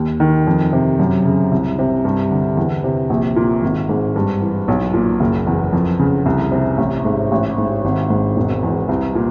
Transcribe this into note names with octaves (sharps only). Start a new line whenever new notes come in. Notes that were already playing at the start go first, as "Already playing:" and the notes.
Already playing: D#2
D#3
F2
C3
F#2
C#3
C2
C3
G2
D3
E2
C3
A#1
A#2
G#1
G#2
G2
E3
B1
A#2
F#1
E2
F2
C#3
C2
C3
A1
G#2
A1
G#2
G#1
G#2
E1
E2
C2
A#2